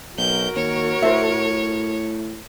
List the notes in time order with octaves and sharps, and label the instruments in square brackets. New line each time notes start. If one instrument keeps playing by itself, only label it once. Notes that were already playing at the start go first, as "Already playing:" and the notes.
[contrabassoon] B1 [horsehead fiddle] F#4 A#4 [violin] G6
[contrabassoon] D#2 [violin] C#5
[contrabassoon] A2 [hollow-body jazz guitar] C5 E5